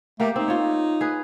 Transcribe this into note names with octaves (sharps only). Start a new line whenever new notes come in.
A3 A#3 G4 A#4
C4 D#4
F4 C#5
G#4 B4